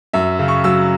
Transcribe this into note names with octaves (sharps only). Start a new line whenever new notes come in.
F#2 E5
C#3
C#6
F#3 E6